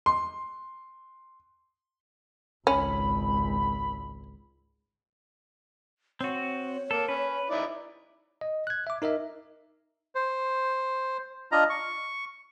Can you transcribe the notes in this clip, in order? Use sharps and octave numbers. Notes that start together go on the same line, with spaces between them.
C6
G#1 C#2 C#4 B5
C4 F#4 C#5
A#3 A4
C#4 B4
D#4 E4 D5
D#5
F#6 G#6
E5 D6
D#4 A#4 D#5 E5
C5
D4 F4 D#5 A#5
C#6